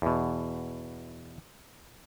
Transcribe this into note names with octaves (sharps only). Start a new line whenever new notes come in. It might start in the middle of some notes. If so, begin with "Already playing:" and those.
E2 B2